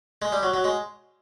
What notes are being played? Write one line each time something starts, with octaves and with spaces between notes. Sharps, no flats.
G#3
G3
F#3
F#3
G#3